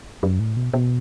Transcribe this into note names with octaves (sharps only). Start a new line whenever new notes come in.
F#2
A2
B2
B2